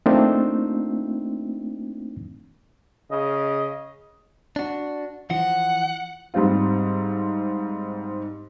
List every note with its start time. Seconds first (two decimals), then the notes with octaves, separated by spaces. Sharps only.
0.06 A3 A#3 C4 D4 D#4 F4
3.11 C#3 D#5
4.56 D4 F#4
5.30 E3 F3 F#5
6.34 G#2 G3 C4 F4